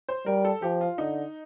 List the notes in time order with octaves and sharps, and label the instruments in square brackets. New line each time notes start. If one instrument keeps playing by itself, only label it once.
[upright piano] C5
[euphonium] G3 [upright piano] A#4
[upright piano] A4
[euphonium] F3 [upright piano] G4
[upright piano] F4
[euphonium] D3 [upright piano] D#4